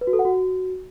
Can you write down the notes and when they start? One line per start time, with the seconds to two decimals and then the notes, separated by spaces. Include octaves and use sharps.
0.01 B4
0.07 F#4
0.13 A4
0.19 F#5
0.25 F#4